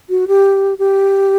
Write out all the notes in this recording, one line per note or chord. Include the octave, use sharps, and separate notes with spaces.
F#4
G4
G4